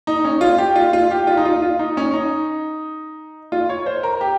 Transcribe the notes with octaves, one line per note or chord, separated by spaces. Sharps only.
D#4
C#4
F4
G4
F4
F4
G4
F4
D#4
F4
F4
D#4
C#4
D#4
F4
C#5
C5
A#4
G4